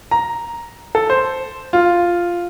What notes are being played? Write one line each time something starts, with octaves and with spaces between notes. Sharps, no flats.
A#5
A4
C5
F4